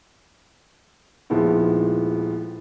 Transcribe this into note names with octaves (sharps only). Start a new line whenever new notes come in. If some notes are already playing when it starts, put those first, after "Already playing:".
D#1 D#3 F3 G#3 B3 E4